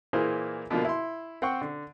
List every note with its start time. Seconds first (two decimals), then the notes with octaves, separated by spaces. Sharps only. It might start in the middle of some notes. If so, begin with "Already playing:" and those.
0.13 A#2 E3 A#3 G#4 C5
0.70 B2 D3 F3 A#3
0.85 E4 C6
1.42 C4 C5 F#5 G5 C#6
1.61 D3